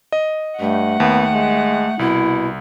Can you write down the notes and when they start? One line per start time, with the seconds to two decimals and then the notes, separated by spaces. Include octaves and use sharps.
0.12 D#5
0.60 G2 A3 F#5
1.00 D#2 B3
1.34 G#3
1.99 C2 B2 E4